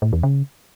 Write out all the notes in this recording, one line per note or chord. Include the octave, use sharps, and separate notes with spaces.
A2
E2
C#3